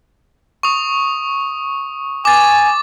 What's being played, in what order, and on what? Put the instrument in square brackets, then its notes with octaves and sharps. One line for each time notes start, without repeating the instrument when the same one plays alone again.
[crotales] C#6 D#6
[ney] G#5 [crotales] D6 A6